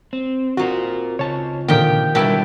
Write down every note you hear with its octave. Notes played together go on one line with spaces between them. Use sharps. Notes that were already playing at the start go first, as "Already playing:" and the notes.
C4
C4 D#4 F4 F#4 A#4
C#3 F4 C#5 A5
A#2 D3 D#3 F3 A#3 D#4 G4 G5
B2 D3 G3 G#3 E4 G4 A4 A#4